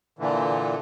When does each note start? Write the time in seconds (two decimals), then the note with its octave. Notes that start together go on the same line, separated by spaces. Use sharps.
0.19 A#2 D3 E3